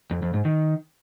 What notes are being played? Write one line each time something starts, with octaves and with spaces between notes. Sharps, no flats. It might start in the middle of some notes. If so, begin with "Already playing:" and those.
F2
F2
G#2
D#3